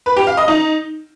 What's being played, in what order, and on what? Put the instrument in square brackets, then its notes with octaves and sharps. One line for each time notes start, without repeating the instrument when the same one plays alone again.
[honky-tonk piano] B4
G4
F5
D#5
D#4